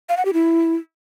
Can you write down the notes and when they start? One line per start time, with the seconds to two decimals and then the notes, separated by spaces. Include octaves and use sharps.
0.09 F5
0.17 F#5
0.25 G4
0.33 E4